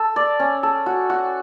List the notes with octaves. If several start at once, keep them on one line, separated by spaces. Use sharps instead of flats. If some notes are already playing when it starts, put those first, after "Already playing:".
Already playing: A4
D5
C#4
A4
F#4
F#4